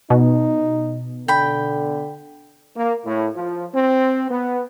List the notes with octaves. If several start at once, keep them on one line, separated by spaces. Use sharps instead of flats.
B2 D#4
D3 G5 B5
A#3
A2
F3
C4
B3